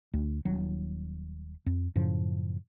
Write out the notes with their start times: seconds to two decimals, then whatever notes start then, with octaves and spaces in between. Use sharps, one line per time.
0.14 D2
0.45 D#1 F#3
1.66 F2
1.96 F#2 A2 C#3 F3